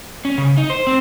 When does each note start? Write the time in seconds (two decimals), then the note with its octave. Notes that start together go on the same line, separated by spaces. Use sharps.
0.25 C#4
0.38 C#3
0.57 D#4
0.70 C5
0.87 C4